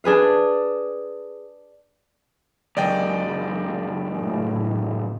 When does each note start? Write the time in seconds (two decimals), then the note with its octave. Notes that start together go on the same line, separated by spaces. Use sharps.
0.04 D4 G#4 B4 F5
2.77 C#2 F#2 D5 D#5 G5
4.18 A2